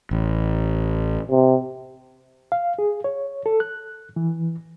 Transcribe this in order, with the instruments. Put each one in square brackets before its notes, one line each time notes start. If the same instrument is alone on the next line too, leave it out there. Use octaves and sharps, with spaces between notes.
[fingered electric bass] A1
[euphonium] C3
[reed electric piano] F5
G#4
C#5
A4
F#6
E3